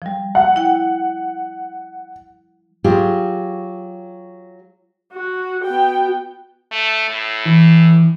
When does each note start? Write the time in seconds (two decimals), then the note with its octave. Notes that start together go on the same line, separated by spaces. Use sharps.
0.02 F3 G3
0.35 F#5
0.56 E4 G5
2.84 F#3 F4 G4 G#4
5.13 F#4
5.65 B3 F#4 G5
6.72 A3
7.10 A2
7.46 E3